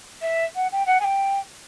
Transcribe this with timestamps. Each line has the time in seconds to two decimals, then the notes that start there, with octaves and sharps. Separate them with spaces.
0.22 E5
0.55 F#5
0.72 G5
0.86 F#5
1.00 G#5
1.04 G5